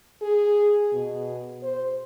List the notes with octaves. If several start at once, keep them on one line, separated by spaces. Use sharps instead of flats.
G#4
B2
C5